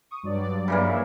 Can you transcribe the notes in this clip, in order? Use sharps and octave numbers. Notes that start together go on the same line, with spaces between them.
C#6 D#6
G2 F#3 D5
C#3 E3 A#3
E5 F5